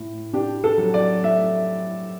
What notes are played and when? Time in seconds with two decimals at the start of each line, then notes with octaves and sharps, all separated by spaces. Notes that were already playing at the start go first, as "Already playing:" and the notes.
Already playing: A2 A3
0.33 D4 G4
0.64 A4
0.78 F#3
0.94 D5
1.23 A3 E5